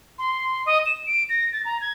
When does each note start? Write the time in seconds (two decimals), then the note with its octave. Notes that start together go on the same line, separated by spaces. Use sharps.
0.18 C6
0.65 D#5
0.86 E7
1.06 D7
1.29 A#6
1.52 A6
1.65 A#5
1.81 G#6